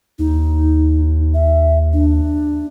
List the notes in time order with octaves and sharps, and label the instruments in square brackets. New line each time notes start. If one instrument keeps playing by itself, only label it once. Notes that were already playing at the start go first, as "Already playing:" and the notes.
[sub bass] D#2 [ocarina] D#4
[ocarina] E5
D4